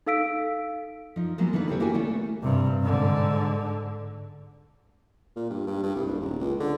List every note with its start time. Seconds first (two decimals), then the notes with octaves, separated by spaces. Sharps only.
0.06 D#4 A4 F5 E6 B6 D7
1.16 F3 D#4
1.38 F3 F#3 G#3 A#3 B3
1.53 D3 E3 B3 D#4 B4
1.68 D#2 A2 C#3 G4 A4 C#5
1.80 A#3 E4 F#4 A#4 G5 G#5
1.94 D#3 G3 A3 B3 C#4
2.43 G2 C3
2.82 G#2 D3
5.36 A#2
5.50 G2
5.67 G2
5.83 G2
5.95 C2
6.07 F#1
6.21 D#1
6.39 C#2
6.60 D3